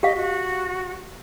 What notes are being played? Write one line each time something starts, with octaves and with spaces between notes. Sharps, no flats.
G4 D#5 F5
F#4